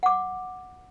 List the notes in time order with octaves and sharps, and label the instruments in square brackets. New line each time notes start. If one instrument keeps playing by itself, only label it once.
[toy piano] F#5 D6